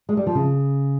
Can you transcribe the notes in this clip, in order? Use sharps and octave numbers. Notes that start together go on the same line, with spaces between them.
G#3
G3
F3
C#3